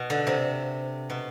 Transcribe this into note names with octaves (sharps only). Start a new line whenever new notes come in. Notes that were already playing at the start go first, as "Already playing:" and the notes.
Already playing: B2
D3
C3
B2